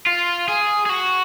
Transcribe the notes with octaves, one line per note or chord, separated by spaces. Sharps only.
F4
G#4
G#4
F#4